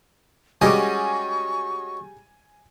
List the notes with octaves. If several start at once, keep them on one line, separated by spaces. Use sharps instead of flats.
G3 G#3 C#4 F#4 D#5 G#5 C#6 D6